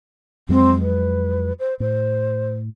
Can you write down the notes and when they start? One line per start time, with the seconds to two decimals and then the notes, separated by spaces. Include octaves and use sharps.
0.49 F2 F#3 G#3 C4
0.81 B4
1.59 C5
1.80 A2 C5